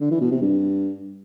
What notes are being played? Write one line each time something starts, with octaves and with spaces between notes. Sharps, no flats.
D3
E3
B2
C3
G2